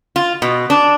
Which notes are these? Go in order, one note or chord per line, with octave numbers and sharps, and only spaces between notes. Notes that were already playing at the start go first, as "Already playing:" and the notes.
F4
B2
D4